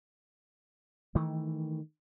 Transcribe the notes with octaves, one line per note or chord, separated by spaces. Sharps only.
D#3 E3 A3